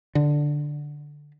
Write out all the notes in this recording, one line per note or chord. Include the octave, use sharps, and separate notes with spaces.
D3